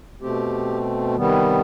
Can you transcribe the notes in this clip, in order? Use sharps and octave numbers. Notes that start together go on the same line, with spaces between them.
B2 A3 C4 G4
C3 D#3 G3 B3